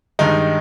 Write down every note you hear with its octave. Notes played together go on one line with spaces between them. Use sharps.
G2 D#3 G#3 D#4